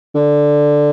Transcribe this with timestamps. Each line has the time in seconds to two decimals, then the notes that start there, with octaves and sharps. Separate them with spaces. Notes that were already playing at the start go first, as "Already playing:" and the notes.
0.15 D3